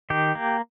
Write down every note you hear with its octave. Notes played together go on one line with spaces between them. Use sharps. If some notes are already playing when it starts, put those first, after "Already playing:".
D#3 G4
A#3